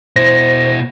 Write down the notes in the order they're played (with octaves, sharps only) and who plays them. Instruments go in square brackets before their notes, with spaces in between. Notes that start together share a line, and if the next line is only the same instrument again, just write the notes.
[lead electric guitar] B2 E4 [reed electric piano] C5 [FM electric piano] A#6